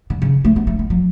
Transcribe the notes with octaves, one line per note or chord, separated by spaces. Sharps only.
D3
C#3
A3
B3
A3
G3
F#3